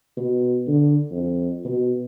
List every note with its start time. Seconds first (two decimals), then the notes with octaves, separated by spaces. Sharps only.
0.17 B2
0.67 D3
1.11 F2
1.65 B2